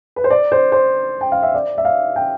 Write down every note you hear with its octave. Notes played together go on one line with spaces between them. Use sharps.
B4
C5
D5
C5
C5
G5
F5
E5
D5
E5
F5
G5